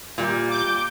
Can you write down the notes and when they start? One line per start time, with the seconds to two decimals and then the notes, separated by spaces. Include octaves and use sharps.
0.18 A#2 G3
0.50 D6 G6